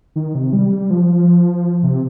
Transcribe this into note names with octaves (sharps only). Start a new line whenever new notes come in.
D#3
C3
G3
G3
F3
C3